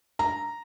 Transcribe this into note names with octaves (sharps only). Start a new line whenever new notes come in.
A#5